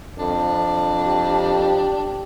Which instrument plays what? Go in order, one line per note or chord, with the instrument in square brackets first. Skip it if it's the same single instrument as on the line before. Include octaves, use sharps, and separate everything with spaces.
[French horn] F2 [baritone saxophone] D4
[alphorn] G4